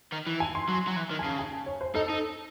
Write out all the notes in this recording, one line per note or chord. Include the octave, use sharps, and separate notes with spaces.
D#3
E3
G#5
C6
F#3
F#3
E3
D#3
G#5
C#3 A5
G#5
A5
C#5
C5
D#4 A4
D#4